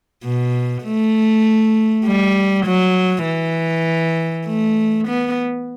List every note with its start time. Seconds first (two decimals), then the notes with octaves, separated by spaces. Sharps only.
0.24 B2
0.84 A3
2.05 G3
2.66 F#3
3.26 E3
4.47 A3
5.08 B3